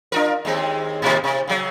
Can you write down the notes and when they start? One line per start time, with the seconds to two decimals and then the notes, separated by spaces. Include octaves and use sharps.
0.12 D4 F4 A#4
0.45 D#2 G#3 C4
1.02 A2 C3 D#3
1.24 C3
1.48 C#3 F#3